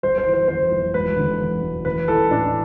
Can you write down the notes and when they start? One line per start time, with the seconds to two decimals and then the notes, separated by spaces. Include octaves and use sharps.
0.03 G1 C5
0.18 C5
0.26 E3
0.34 C5
0.48 F2 C5
0.71 G1
0.94 E1 B4
1.17 D3
1.40 E2
1.63 E1
1.85 A1 B4
2.08 E3 A4
2.31 A2 D4